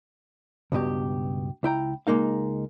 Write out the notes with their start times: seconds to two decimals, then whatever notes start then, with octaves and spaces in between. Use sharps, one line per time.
0.72 C#2 G2 B2 G4
1.63 C#2 E4 G5 A#5
2.07 C#2 G#3 A#3 D#4 F5